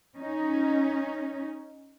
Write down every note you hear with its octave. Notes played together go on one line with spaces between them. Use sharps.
C#4 D#4